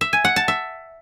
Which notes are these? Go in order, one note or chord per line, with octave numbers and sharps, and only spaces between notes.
E5
G#5
F#5
A5
E5